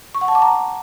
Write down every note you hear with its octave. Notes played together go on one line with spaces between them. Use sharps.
C#6
F#5
A5
D6
A#5